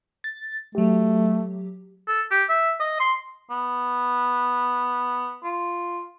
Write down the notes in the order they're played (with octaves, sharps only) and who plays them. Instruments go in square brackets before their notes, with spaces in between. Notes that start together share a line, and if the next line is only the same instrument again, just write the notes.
[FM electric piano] A6
[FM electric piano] F#3 G4 [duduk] A3
[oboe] A4
G4
E5
D#5
C6
[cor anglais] B3
F4